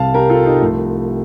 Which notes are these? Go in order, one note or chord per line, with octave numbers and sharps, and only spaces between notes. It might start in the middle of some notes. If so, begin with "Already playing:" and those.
Already playing: C2 C3 G3 F5 A5
G4 A#4
F4 A4
D#4 G4
C2 C3 F3 A3